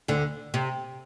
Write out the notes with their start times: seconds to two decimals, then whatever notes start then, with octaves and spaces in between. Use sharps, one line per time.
0.08 D2 D3
0.54 C3